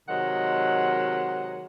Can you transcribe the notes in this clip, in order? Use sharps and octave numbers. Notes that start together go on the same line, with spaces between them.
C3 D#3 F#3 G#3 F#5